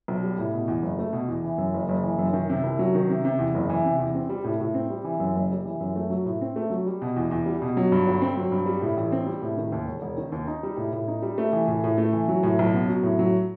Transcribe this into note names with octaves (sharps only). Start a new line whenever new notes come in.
B1
G3
A2
B2
E2
F#1
A3
B2
E2
E3
F#2
F#1
F#1
E3
F#2
D#3
C3
C2
F#3
D#3
C3
C3
E2
F#1
E3
C3
E2
C4
G3
A2
A2
C4
G3
E3
F#2
F#1
G3
E3
F#2
A3
F#3
A2
C4
A3
F#3
G3
B2
E2
E2
G3
B2
F#3
G2
G1
C4
F#3
G2
G3
A2
A1
C4
G3
A2
D#3
D#2
E1
E1
D#3
D#2
D#4
G3
A2
A2
D#4
G3
A3
E3
A2
A2
A3
E3
F#3
A2
B1
B3
F#3
A2
F#3